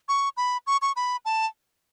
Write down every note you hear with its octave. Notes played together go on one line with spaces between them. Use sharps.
C#6
B5
C#6
C#6
B5
A5